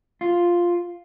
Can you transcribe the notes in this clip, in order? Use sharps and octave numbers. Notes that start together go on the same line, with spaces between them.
F4